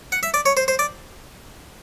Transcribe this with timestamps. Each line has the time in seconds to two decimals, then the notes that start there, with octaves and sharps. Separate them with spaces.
0.12 F#5
0.23 E5
0.34 D5
0.46 C#5
0.57 C5
0.68 C5
0.79 D5